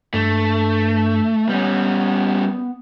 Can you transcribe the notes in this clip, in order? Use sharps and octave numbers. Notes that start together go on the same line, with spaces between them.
G2 A3
G3 B3 C#4